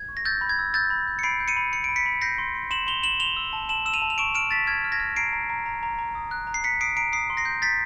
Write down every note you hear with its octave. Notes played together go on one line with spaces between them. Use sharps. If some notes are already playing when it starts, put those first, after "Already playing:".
Already playing: G#6
C#6
A#6
E6 G6 A6
B5
G#6
E6
E6 G6 A6
B5
G6
C#7
B5 C7 D7
G6
C#7 D#7
B5
B5 C#7
B5 D7
B6 C#7
B5
G6 A#6 C7
C6
C6
C6 E7 F#7
C6 F7 G7
C6 E7 F#7
C6 F7 G7
E6
A5
A5 E7 F#7
E6 E7
D#7 F7
A5
F7
C#6 D7 E7
F6 D7 E7
C#6 A6 B6
F6 G#6
F6
G#6 A#6
F6
A#5 C7 D7
A#5
A#5
A#5
A#5
A#5
D#6
F#6
A#5
C7
A#5 B6 C#7
D#6 C7 D7
A#5 C7 D7
D#6 C7 D7
C6
A#6 C7
G6
G6 A6 B6